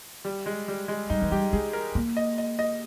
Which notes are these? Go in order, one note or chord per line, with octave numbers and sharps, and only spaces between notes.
G3
G#3
G3
G#3
G3 D#4
E3
G3 G4
G#3 G#4
A#4
A#3
D#5
D#5
D#5